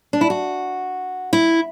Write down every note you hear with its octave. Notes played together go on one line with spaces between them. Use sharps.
D4
E4
F#4
E4